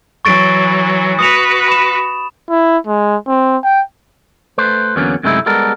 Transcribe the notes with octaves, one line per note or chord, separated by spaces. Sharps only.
E3 F#3 C#6 A6 D7
F#4 B4 D#6 F7
B5 E7
E4
G#3
C4
G5
A3 B4 C5
E2 D3 F#3 A#3 B3 C#4
F#2 C3 G#3 A3 D#4 E4
G3 G#3 B3 A4 A#4